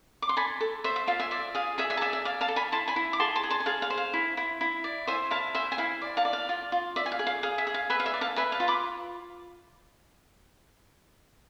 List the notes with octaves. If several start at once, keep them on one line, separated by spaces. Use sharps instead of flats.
D6
C6
A4 G#5 B5
A4
C5 E5
E5
F4 F5
E5 G#5
D5 E5
G#4 F5
G#4 E5 G#5
E5 G#5
A5
D5 E5 G#5
E5
D5 F5
F5 A5
A4
G#5 B5
E4 A5 C6
G#5 B5
E4
D6
G#4 A5 C6
A5 C6
G#4
A5 C6
G#5
G#4 F5 A5
F5
C5
F5
E4
E4
E4
D5
C5 E5 G#5
E4 F5 A5
C5 E5 G#5
G#5
E4 F5
D5
F5 A5
D5
F5
F4
F4
D5 E5
G#5
F5
G#4
F5
G#4 F5
E5
G#4
F5
B4 E5 G#5
F5
E5 G#5
D5
F5 A5
B4 E5 G#5
F5 A5
F4
B5 D6